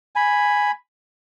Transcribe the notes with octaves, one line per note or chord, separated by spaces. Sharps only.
G#5 B5